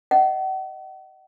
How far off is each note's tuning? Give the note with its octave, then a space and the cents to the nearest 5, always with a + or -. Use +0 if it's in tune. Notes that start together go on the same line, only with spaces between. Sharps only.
D#5 +0 F#5 +40